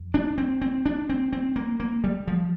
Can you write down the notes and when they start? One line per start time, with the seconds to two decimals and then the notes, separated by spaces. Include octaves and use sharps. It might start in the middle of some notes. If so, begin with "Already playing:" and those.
Already playing: F2
0.14 D4
0.38 C4
0.61 C4
0.86 D4
1.09 C4
1.33 C4
1.56 A#3
1.80 A#3
2.04 G3
2.28 F3